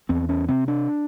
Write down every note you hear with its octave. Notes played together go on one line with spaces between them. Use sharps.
E2 C4
C#4
C3 C4
D4